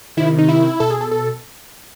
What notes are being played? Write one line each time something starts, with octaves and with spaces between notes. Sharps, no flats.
C3 D#3 E4
D#4
E4
B2 A4
G#4
A4
A4